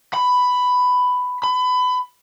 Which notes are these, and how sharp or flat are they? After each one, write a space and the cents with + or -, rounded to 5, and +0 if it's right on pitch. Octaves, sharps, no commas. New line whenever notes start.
B5 +10
B5 +25